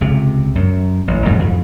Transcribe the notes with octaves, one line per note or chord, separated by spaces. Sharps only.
C#2 C3
F#2
A1
F2 G#2 D#3 F#3
F2